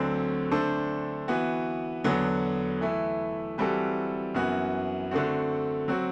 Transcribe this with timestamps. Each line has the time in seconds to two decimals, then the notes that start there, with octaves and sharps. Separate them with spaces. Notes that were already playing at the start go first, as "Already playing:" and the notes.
Already playing: D2 D3 F#3 C4
0.51 D3 A3 D4 A4 C5
1.28 E3 B3 F#4
2.04 E2 D3 F#3 B3 F#4
2.81 E3 A3 E4
3.58 E3 G3 C4 F#4 A4
4.34 F#2 E3 B3 F#4
5.11 D3 A3 C4 F#4
5.88 F#3 C4 F#4